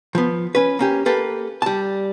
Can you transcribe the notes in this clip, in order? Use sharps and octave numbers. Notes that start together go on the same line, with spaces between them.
F3 B3
C#4 B4
A#3 C#4 G4
A#3 G4 A4 B4
G3 A5